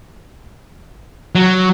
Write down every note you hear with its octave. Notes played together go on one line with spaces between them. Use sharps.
F#3